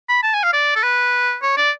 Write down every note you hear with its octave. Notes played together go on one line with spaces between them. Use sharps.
B5
A5
G#5
F5
D5
A4
B4
C#5
D5